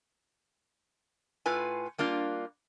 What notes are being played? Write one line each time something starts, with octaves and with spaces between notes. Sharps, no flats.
A2 F4 B4 G#5
G3 A#3 D4 F4